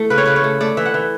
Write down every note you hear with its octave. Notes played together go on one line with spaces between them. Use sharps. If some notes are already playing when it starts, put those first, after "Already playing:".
Already playing: E3 A3
C#3 B4
C#5
C#3 B4
C#5
A3
A3 D5
E3 E5
F#5
E3